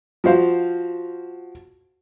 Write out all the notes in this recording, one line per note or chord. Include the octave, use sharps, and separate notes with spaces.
F3 F#4 C5 F5